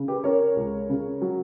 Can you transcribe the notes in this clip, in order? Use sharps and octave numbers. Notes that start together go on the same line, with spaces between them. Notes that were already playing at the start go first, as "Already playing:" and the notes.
Already playing: C#3
G4 B4
C#4 A#4 C#5
C#2
C#3
F#3